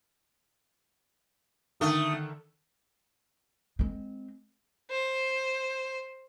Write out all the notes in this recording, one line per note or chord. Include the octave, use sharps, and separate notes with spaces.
D3 D#3 A3 D#6
G#3 C4
C5